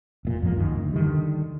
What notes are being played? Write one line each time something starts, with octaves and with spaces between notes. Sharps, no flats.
F1 A#2
F2 G#2 F3 A#3
C#2 F#2 D#3
D2
D3 D#3 G3